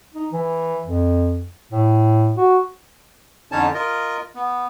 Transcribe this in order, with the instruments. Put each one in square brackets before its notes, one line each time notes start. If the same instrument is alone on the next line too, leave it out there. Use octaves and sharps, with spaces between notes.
[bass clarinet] D#4
E3
F2
A2
F#4
[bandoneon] F2 D3 C#4 D#4 C#5 A5
F4 A#4 D#5
B3